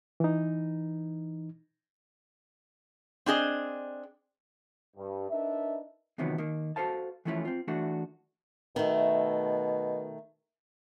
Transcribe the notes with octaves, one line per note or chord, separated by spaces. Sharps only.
E3 D#4
C4 D4 G#4 D#5
G2
D4 D#4 A#4 B4 E5
E2 C3 D#3 F3 F#3 B3
D#3 A#3
F#4 G4 A4 C5 F5 A5
E3 F3 A3 C#4 E4 F4
C4 F4
E3 A3 D4 F#4
B2 D#3 A3